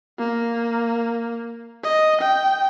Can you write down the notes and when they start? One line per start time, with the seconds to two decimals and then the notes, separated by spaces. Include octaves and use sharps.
0.19 A#3
1.83 D#5
2.21 G5